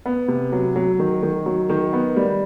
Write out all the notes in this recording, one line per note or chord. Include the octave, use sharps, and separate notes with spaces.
B3
C3
F#3
F#3
D#3
D#3
F#3
D#3
B3
G3